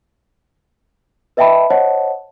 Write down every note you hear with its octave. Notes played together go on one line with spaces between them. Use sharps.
B4 D#5 E5 G5 A5 B5
C5 C#5 D#5 F#5 A5